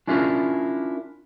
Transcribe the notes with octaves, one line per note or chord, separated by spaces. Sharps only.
C#4 D4 E4 F4 A#4